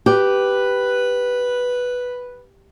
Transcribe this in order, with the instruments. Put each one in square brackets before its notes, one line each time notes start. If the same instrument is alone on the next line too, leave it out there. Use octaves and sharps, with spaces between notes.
[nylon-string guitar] G4 [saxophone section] B4